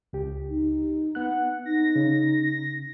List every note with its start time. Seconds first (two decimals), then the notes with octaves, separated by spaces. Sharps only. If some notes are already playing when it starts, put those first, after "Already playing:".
0.13 C#2 G4
0.49 D#4
1.15 B3 F#5 F#6
1.66 D#4 A#6
1.96 C#3